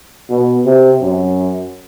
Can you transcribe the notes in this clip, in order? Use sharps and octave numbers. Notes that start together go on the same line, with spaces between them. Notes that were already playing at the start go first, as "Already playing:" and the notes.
B2
C3
F#2